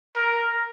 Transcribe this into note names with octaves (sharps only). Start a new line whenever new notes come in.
A#4